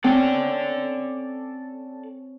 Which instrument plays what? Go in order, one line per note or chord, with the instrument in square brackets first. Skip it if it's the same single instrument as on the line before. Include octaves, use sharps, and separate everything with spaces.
[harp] C4 C#4 [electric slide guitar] A4 D5